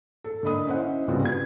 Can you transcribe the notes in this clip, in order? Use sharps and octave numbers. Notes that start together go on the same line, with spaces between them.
A4
D3 A#3 D#5 B5 D#6
C#4 E4 C5 D#5 F#5
C2 C#3 B3 C4 F4 F#4
B3 G#6